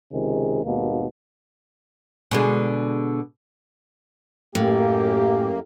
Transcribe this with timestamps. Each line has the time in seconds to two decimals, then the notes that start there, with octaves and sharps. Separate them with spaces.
0.12 C#2 C3 D#3 G#4
0.64 G#1 D#2 B2 A#3
2.31 B2 D3 G#3
4.55 F#2 A2 A#3 G4